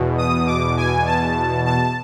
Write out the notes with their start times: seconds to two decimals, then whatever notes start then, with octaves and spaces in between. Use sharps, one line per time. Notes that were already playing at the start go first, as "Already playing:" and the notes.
Already playing: E2 B2
0.18 D#6
0.47 D6
0.77 G#5
1.06 A5
1.66 A5